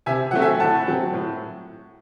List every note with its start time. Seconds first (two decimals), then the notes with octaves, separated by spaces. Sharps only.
0.06 C3 E5 G#5
0.31 F#3 A3 C4 F#5
0.42 E5 G#5
0.60 A2 F#5 A5
0.87 F#3 C4
1.13 A2